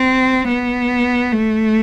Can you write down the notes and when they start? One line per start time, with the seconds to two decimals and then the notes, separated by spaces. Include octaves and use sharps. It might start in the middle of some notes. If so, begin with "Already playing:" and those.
Already playing: C4
0.48 B3
1.32 A3